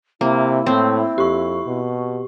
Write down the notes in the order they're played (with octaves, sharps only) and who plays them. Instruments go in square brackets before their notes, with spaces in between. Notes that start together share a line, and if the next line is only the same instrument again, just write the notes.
[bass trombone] C3 [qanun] A#3 [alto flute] E4
[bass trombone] A2 [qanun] C4
[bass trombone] F2 [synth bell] G4 C#6
[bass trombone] B2